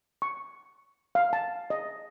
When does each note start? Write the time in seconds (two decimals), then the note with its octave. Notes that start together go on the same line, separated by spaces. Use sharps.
0.22 C#6
1.15 F5
1.33 A5
1.70 D#5